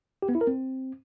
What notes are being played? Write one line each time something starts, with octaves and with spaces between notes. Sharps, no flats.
G4
B3
E4
A#4
C4